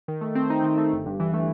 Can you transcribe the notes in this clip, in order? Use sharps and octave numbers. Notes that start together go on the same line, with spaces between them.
D#3
A3
C4
D#4
D#3
A3
G1
G2
E3
A3